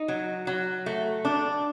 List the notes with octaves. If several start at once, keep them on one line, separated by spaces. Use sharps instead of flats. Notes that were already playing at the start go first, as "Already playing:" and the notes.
Already playing: D#4
F#3
F#3
A3
D4